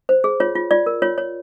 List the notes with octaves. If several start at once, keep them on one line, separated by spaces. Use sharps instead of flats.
C5
G#4
F4 C#5
F4
F4 D5
A#4
F4 C#5
C#5